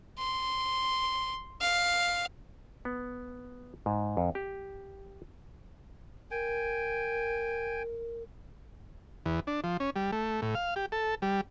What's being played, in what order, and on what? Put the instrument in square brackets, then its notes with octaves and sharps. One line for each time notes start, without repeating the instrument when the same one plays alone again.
[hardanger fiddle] C6
F5
[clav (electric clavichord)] B3
G#2
F2
G4
[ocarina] A#4 [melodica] G5 G#5
[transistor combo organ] E2
D4
F3
C#4
G3
A3
A2
F5
G4
A4
G3